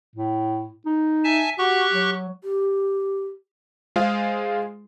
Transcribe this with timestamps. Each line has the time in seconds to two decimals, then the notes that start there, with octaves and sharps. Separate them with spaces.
0.15 A2
0.86 D#4
1.24 E5 G#5 A5
1.58 F#4 G4 C#6 F#6
1.92 F#3
2.44 G4
3.96 G#3 F4 G#4 C5 F5